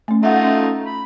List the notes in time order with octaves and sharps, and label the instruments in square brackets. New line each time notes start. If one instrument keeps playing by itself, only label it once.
[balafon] A3 C#4
[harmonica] A3 D#4 F4 [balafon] E5 F#5
[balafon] C#4
[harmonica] B5